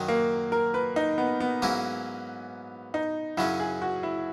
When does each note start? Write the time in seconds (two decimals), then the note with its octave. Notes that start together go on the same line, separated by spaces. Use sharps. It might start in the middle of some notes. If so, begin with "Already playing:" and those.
Already playing: F#2 D#3 F#3
0.08 A#3
0.52 A#4
0.74 B4
0.96 D#4
1.18 B3
1.40 B3
1.62 G#2 F#3 A#3 C#4 E4
2.94 D#4
3.37 F#2 C#3 F#3 C#4 E4
3.60 G#4
3.82 F#4
4.03 E4